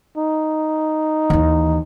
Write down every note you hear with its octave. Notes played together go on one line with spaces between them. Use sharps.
D#4
D#2 E3